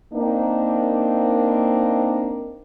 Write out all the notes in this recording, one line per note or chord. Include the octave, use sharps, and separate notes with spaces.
A#3 C4 D4 D#4 A#4